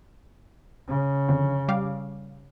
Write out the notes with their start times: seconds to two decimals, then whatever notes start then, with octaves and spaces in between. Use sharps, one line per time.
0.88 C#3
1.29 F2 D3
1.69 G3 F5 D6